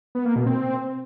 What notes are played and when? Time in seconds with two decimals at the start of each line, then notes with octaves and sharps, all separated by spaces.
0.15 B3
0.25 A#3
0.36 B2
0.46 C4